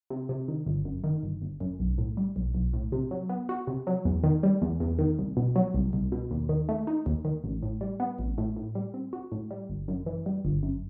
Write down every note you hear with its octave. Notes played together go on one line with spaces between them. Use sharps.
C3
C3
D#3
G1
F#2
D#3
G1
G1
F#2
B1
A2
G3
B1
B1
A2
C3
F#3
B3
F#4
C3
F#3
E2
D#3
G3
E2
E2
D#3
C2
B2
F#3
C2
C2
B2
D#2
D#3
A3
D#4
D#2
D#3
A1
A2
G3
B3
A1
A2
A2
G3
C4
F#4
A2
G3
G1
F#2
E3
G3
G1
F#2